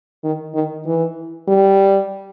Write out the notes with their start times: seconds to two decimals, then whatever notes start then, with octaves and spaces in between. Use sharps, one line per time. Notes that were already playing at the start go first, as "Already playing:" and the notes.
0.24 D#3
0.54 D#3
0.86 E3
1.48 G3